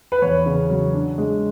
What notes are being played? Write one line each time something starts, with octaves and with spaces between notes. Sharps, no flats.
B4
E2 C#5
C#3
F#3
D4
G#3